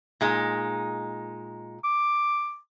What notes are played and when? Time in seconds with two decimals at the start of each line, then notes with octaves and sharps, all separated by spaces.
0.21 A#2 G#3 D#4
1.84 D6